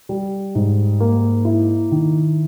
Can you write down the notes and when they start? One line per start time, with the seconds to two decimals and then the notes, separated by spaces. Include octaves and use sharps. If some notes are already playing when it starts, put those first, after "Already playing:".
0.09 G3
0.55 G#2
1.00 A#3
1.45 E4
1.92 D#3